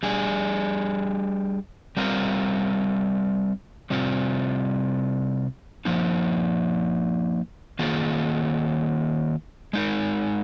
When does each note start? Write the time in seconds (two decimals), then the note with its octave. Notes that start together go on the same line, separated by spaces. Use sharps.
0.03 G3 D4 G#4
1.97 G3 C4 F4 A#4
3.90 C3 G3 C4 F4
5.85 F3 A#3 D#4
7.79 D#3 A#3 F4 G#4
9.73 G#3 D#4 A#4